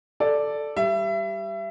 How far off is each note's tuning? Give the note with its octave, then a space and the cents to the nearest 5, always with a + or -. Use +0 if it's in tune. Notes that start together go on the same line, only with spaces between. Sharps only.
A4 +0 D5 +0
G3 +0 E5 +30